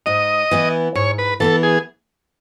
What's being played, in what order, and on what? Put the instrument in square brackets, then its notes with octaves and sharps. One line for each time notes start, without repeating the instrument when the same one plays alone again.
[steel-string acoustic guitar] G#2 [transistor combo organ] D#5
[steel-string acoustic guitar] E3 B3 E4
[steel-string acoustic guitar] G#2 [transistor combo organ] C#5
[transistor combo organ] B4
[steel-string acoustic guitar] E3 B3 E4 [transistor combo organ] A4
[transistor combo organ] G#4